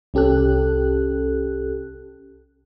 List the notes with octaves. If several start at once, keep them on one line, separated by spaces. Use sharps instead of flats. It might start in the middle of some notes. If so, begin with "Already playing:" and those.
C2 C#4 G4 A4 F#6